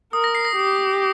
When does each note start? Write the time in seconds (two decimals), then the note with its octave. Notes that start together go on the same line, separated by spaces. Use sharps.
0.13 A#4 D#6
0.24 A#6
0.35 C7
0.45 A#6
0.56 G4